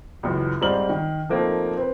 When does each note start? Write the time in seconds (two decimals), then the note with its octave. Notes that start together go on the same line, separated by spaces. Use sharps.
0.23 C#2 F#2 E3
0.61 G#2 G3 C4 A#5 F6 F#7
0.89 D#3
1.29 F3 A3 A#3 C4 D#4
1.77 C4 B4